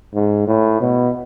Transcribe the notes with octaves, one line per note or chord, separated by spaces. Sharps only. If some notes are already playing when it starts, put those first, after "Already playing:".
G#2
A2
B2